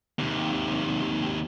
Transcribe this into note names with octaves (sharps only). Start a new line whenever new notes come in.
D#2 C3